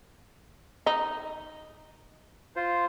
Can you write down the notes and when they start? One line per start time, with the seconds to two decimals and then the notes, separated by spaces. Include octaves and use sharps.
0.86 D#4
2.56 F4 C5